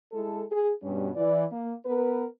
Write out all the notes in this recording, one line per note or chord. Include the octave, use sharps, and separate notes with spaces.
G#3 E4 A4
G#4
G2 B2 G3 C#4
E3 D5
A#3
B3 A#4 B4